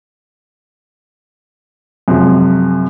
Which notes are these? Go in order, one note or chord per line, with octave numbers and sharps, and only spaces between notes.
F#2 C3 F3 G#3